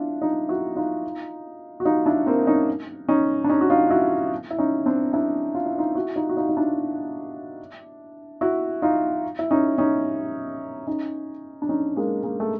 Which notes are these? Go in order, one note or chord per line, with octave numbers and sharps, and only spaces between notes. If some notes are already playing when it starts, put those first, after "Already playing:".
Already playing: D4 E4 F4
D#4 F4
E4 F#4
D#4 F4
F#4
D#4 F4
D4 E4
A#3 C4
C#4 D#4
C#4 D#4
D4
C#4 D#4
F#4
D#4 F4
E4 F#4
E4
C#4 D#4
C4 D4
D4 E4
F4
E4
D#4 F4
E4 F#4
D#4 F4
F#4
D#4 F4
D#4
D4 E4
E4 F#4
D#4 F4
E4
C#4 D#4
C#4 D#4
C#4 D#4
D4
C#4 D#4
G#3 A#3
G#3 A#3
A3